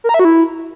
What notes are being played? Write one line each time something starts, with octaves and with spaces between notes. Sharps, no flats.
A#4
A#5
E5
F#4
E4